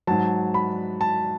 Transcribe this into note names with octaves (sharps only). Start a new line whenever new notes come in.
G#2 F#3 A5
B5
A5